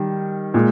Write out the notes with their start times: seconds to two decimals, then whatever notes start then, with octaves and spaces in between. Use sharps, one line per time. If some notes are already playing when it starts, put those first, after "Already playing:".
Already playing: D#3 G3
0.54 A#2 G#3